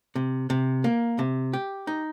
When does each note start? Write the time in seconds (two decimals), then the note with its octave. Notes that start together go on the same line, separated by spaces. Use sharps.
0.15 C3
0.50 C3
0.84 A#3
1.19 C3
1.53 G4
1.87 D#4